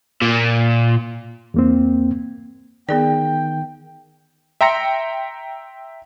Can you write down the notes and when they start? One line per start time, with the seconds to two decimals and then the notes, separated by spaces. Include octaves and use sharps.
0.22 A#2
1.54 E2 A#3 C4
2.89 D#3 B3 G#4 D5 G5
4.61 E5 G5 A#5 C6 A#6 C#7